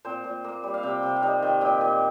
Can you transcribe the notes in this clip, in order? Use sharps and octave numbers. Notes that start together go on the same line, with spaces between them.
A#2 C4 C5
A#2
A#3
G3
F5
C3 G4 G5
C3
F5
G3 D#4 D#5
D#3
A#2 G4 G5
A#2